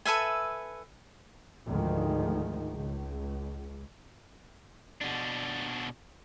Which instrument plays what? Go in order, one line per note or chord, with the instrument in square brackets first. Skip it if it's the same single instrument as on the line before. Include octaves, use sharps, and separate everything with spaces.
[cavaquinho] A4 B4 E5 G#5
[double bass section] D2 G#2 D#3 F3
C#2
[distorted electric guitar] B2 D4